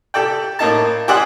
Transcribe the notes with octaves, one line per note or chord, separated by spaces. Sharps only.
G4 A4 D5 G5
A2 A#3 D#4 A5
G4 G#4 C5 D5 D#5 F#5